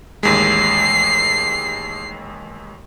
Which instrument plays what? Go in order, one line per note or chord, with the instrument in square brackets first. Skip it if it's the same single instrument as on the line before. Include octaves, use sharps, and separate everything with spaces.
[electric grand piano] A1 D#2 G#3 [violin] C7